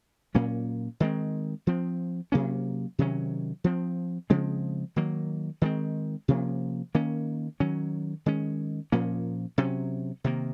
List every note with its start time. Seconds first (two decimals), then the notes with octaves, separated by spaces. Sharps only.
0.34 A#2 F#3 A#3 C#4
1.00 D#3 G#3 C4
1.67 F3 C4
2.32 C3 F#3 A#3 C#4
2.99 C3 D#3 F#3 C#4
3.64 F3 C4
4.30 C#3 F3 G#3 C4
4.96 D#3 F#3 A#3
5.62 D#3 G#3 C4
6.28 C3 F3 A#3 C#4
6.94 D#3 A#3 C#4
7.60 D#3 F#3 C#4
8.26 D#3 G#3 C#4
8.92 A#2 F3 A#3 C#4
9.58 C3 F#3 C#4
10.24 C3 D#3 A#3